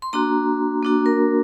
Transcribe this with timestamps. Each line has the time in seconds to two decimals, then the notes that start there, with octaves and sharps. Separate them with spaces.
0.02 C6
0.13 A#3 D4 F#4 A#5
0.83 A#3 D4 F#4
1.06 A#4